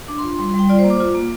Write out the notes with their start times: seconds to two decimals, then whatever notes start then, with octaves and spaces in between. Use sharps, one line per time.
0.08 D4 D6
0.18 C6
0.23 F4
0.28 C6
0.39 G3 C6
0.49 C6
0.54 G3 G5
0.69 F4 D5
0.79 C5
0.84 A#3
0.90 D6
1.00 F4
1.15 A#3